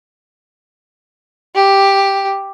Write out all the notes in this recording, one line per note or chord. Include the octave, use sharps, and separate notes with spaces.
G4